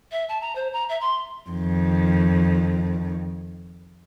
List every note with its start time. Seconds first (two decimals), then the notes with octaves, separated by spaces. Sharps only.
0.11 E5
0.28 A5
0.41 A#5
0.55 C5
0.73 A#5
0.89 E5
1.00 C6
1.50 F2 D#3